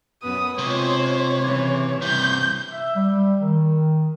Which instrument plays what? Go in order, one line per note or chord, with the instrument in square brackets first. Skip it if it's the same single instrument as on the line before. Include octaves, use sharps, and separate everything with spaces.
[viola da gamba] F#2 B3 B4 [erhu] D#6
[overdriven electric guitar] C3 [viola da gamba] G#3 F4 C5 [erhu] C#5
[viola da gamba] C#3 E3 G3
[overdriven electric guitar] G2 C3 [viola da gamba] E4 [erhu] G6
[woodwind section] E5
G3
D#3